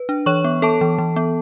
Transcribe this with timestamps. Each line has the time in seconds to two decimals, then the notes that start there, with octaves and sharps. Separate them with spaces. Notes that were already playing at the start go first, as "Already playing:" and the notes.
Already playing: B4
0.09 D4
0.26 E3 C#5 C#6
0.44 B3
0.62 B3 A4 A5
0.81 E3
0.98 E3
1.16 B3